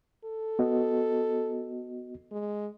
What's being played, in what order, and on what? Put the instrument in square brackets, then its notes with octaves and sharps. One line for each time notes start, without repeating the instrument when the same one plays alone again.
[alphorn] A4
[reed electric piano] B3 F#4 D#5
[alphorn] G#3